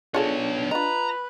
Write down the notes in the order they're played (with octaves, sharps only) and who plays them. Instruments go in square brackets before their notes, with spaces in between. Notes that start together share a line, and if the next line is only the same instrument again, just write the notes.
[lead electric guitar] B3 C#5 [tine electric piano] D4 [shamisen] F4 G#4 A4
[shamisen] F4 D#5 [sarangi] B4 [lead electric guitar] A#5